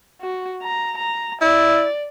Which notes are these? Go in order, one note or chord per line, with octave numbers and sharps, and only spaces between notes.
F#4
A#5
A#5
E4 D5